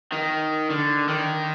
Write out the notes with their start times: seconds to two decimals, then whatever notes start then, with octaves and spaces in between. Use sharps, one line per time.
0.12 D#3
0.70 D3
1.09 D#3